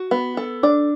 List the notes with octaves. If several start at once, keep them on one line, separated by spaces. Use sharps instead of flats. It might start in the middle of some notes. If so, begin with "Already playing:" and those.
Already playing: F#4
B3
A4
D4 D5